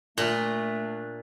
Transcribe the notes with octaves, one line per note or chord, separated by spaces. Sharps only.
A#2 A3 D4